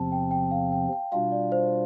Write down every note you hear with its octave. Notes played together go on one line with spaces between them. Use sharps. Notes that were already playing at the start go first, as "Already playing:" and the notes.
Already playing: E2 C3 F3 C4 A5
G5
G5
F5
G5
G5
B2 G3 D4 F4 F5
D5
C5